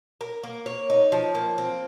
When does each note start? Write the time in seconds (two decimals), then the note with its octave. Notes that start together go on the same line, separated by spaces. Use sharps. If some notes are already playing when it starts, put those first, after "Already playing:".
0.21 A#4
0.43 A#3
0.66 C#5
0.90 D#4
1.12 F3
1.35 A#3
1.58 C4